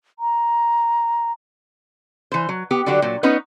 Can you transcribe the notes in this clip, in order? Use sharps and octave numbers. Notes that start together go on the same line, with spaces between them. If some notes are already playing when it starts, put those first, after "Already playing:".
A#5
E3 C5
F#3
B3 G4
D3 F#3 G3 F#4 G4
A#2 F#3
B3 C#4 D#4 B4